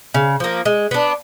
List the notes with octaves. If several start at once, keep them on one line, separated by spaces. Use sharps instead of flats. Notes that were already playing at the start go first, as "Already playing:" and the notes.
C#3
F3 A#3
G#3
B3 D4